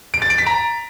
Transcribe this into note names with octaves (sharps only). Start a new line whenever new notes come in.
D7
A6
D7
B6
A#5